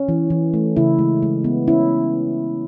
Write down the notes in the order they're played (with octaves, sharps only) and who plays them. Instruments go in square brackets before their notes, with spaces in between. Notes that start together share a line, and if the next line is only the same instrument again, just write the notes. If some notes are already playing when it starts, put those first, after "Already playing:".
Already playing: [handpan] C#4
E3
E3
A3
C#3 E4
G#3
G#3
B3
C#4 E4